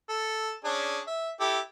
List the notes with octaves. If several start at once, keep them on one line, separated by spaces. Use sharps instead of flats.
A4
C#4 D4 G#4
E5
E4 G4 A4